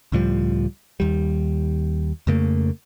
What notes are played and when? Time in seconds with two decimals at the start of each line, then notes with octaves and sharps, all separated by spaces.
0.12 C#2 A2 F3 G3
1.00 D#2 G3
2.27 F2 C#3 A3 A#3